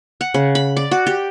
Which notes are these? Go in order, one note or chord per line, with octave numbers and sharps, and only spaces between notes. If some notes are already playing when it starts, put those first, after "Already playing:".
F#5
C#3
B5
D5
F#4
G4